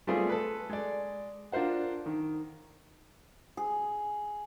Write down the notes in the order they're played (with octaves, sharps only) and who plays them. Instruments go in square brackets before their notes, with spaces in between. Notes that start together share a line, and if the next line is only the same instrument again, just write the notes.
[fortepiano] G3 A3 B3 C4 F4 G#4
A4 B4
G#3 D5
D4 F4 A#4 C5 F#5
D#3
[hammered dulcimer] G#4